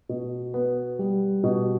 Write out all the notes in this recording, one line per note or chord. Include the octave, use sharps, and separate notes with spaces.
B2
B3
G3
B2